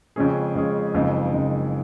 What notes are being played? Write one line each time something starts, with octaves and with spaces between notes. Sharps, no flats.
F2 C#3 G#3 C#4 G#4
F2 C#3 G#3 C#4 G#4
F#1 F2 C#3 G#3 D#4
F#1 F2 C#3 G#3 D#4